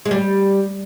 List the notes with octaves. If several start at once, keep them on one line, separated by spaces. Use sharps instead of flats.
G#3
G3